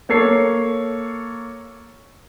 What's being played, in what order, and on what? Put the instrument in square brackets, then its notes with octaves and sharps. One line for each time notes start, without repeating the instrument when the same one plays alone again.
[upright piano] A#3 A4 C#5 C7